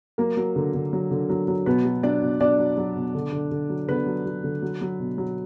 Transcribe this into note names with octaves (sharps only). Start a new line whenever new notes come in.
F#3 A#3 A#4
F#3
D3
D3
F#3
D3
F#3
F#3
B2 B3 B4
F#3
F#3 D4 D5
B2
B2 D4 D5
F#3
F#3
B2
D3
D3
D3
F#3
D3 B3 B4
F#3
F#3
D3
F#3
F#3
B2
F#3